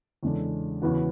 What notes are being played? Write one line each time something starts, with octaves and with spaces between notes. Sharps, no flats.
E2 C#3 G#3 D4 A4
E2 C#3 E3 B3 F#4